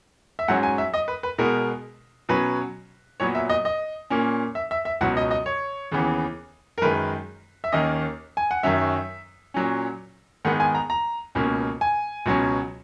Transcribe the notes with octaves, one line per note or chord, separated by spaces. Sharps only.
E5
G#2 F#3 C#4 F#5
G#5
E5
D#5
B4
B4
B2 G#3 B3 A#4
B2 F#3 C#4 B4
A#2 F#3 B3 C#5
E5
D#5
D#5
A#2 A#3 C#4
E5
E5
E5
C#2 B2 F#3 F#5
D#5
D#5
C#5
D#2 C#3 E3 B3
A#4
F#2 D#3 G#3 B4
E5
D#2 D#3 A#3 C#4 D#5
G#5
F#5
F#2 D#3 F#3 C#4 E5
A#2 F#3 C#4
G#2 D#3 G#3 B3 F#5
G#5
A#5
A#5
C#2 B2 A#3 C#4
G#5
C#2 B2 F#3 C#4